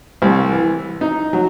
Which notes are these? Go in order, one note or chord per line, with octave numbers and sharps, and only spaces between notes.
C2
E3
D#4
F#3